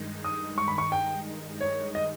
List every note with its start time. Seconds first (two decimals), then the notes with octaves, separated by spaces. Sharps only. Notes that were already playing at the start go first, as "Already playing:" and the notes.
Already playing: G2 D#3 G#3 D#4
0.24 D#6
0.58 C#6
0.68 B5
0.78 C#6
0.92 G5
1.61 C#5
1.95 D#5